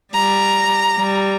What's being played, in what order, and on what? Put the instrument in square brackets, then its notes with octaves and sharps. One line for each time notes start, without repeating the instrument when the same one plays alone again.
[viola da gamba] G3 [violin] A#5
[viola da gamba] G3